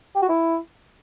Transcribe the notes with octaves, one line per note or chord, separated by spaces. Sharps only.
G4
F#4
E4